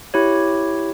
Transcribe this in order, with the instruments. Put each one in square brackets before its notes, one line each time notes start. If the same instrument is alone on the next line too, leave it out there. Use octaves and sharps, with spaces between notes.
[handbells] E4 G4 C#5